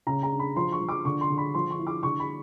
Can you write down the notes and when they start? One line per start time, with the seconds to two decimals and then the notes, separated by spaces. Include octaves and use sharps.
0.07 C#3 A#5
0.23 A#5
0.31 D4
0.39 B5
0.56 F3 C6
0.72 C#6
0.81 F3
0.89 D6
1.05 D3 C#6
1.21 C6
1.30 D3
1.38 B5
1.54 F3 C6
1.71 C#6
1.79 E4
1.87 D6
2.03 D3 C#6
2.20 B5